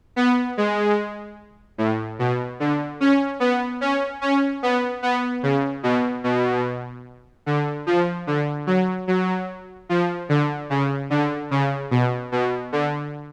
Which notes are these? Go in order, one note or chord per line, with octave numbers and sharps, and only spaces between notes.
B3
G#3
A2
B2
D3
C#4
B3
C#4
C#4
B3
B3
C#3
B2
B2
D3
F3
D3
F#3
F#3
F3
D3
C#3
D3
C#3
B2
B2
D3